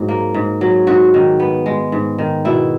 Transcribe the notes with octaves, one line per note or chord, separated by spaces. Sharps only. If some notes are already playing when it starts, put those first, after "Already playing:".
Already playing: G#2 F#3
A#3
G#2
F#3
G#2 F#4
D#3
B3
G#3
G#2
D#3
B2 E4